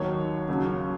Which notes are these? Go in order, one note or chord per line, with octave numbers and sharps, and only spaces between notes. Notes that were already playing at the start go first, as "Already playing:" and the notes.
Already playing: D#2 D#3 F#3 C#5
D#2 C#3 F#3